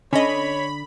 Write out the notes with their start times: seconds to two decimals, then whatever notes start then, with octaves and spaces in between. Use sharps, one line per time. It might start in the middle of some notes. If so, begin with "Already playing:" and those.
0.13 D3 C#4 C#5 D#5 B5